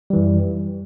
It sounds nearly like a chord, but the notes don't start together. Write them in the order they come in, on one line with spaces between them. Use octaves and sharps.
G3 E3 F#2